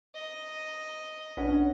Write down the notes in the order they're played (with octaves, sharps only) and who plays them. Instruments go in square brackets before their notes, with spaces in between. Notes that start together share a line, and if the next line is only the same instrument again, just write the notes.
[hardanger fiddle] D#5
[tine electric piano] A#1 D4 F#5 [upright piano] C#4 B4 C#5